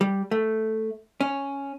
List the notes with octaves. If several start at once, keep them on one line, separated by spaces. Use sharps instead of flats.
G3
A3
C#4